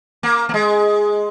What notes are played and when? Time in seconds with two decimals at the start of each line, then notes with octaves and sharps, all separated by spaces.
0.23 A#3
0.49 A#3
0.54 G#3